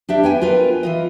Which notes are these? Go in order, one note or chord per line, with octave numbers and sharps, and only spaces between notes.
D4 G4 E5
B3 G5 G#5
F4 A#4 B4
E3 F4 D#5